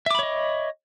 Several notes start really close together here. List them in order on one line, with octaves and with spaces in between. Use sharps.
E5 D6 B5 C#5 D#5